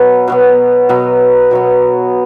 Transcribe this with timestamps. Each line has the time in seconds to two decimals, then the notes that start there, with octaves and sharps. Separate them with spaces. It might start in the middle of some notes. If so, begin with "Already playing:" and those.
Already playing: B2 F#3 B3
0.28 B2 F#3 B3
0.89 B2 F#3 B3
1.51 B2 F#3 B3